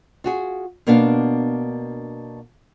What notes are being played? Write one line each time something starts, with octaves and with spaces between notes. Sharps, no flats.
F4 F#4 G#4
B2 A#3 B3 D4 F5